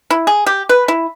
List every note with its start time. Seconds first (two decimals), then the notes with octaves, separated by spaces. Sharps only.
0.10 E4
0.27 G#4
0.46 G4
0.69 B4
0.88 E4